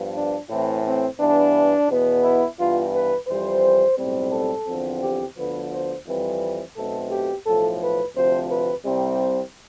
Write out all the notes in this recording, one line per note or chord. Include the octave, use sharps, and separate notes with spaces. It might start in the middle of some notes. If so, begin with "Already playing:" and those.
Already playing: G2 F3 B3
D4
A2 E3 A3 C4 E4
C4
G2 E3 B3 D4
E2 B2 B3
E4
G2 E3 B3 F4
B4
F2 E3 G3 C5
B1 A2 G3 C4
A4
E2 D3 F3 C4
G4
D2 D3 F3 B3 B4
C5
F2 E3 G3 C4 B4
B1 B2 A3 C4 A4
G4
B1 A2 F3 A4
B4
D2 C3 F3 C4 C5
B4
C2 C3 G3 C4